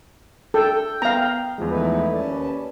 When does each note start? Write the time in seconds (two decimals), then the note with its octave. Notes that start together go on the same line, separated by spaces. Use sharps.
0.54 A4 G5
1.02 B3 F5 A#5
1.58 E2 F3 G#3
1.71 A3 D#4 E4 B4
2.14 D#2 C#4 D5 A5